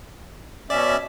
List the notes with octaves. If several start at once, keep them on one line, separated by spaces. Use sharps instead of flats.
B2 C#4 D5 E5